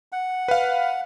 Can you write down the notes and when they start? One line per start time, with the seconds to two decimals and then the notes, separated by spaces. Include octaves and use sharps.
0.12 F#5
0.48 B4 F5